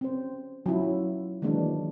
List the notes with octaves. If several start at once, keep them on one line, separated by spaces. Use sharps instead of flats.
C4 C#4 C5
F#3 C#4 E4 F4
D#3 E3 F#3 G#3 A#3 D4